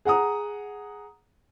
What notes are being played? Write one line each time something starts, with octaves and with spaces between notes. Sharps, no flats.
G#4 F#5 A#5 D#6